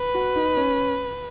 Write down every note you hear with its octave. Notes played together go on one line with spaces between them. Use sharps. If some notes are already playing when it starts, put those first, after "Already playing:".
Already playing: B4
F#4
D#4
C#4